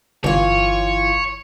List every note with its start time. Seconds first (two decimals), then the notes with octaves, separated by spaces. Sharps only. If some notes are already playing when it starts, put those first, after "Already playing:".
0.24 G1 E3 F4 C#5